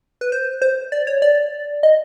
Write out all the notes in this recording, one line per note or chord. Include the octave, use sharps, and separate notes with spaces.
B4
C5
C5
D5
C#5
D5
D#5